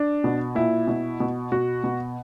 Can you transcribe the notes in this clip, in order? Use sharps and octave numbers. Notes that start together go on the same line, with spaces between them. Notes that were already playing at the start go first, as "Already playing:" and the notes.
Already playing: D4
B2
A#2 E4
B2
B2
B2 F#4
B2